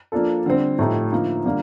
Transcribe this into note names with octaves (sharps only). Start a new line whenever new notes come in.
F3 A#3 D4 F4 A4
D3 G3 C4
A2 F3 A3 D#4 G4
D3 F3 A#3 D#4
D3 G3 A#3 F4